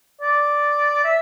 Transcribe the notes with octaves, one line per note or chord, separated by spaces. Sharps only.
D5
E5